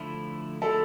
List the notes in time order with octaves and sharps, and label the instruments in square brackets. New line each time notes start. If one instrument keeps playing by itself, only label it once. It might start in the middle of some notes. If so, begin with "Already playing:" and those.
Already playing: [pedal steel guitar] D3 F3 A3 E4
[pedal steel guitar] D3 F3 A3 E4 [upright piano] A4